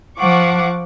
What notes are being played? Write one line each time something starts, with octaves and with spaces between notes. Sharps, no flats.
F3 F#5 C#6 D6